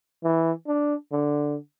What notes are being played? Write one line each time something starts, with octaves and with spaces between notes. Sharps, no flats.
E3
D4
D3